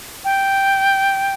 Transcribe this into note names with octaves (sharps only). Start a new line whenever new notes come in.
G5